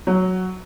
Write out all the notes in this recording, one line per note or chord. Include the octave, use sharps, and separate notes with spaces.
F#3